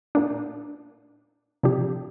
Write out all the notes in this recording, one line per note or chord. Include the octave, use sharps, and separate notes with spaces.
A#2 A#3 D4
C3 F3 D4 G4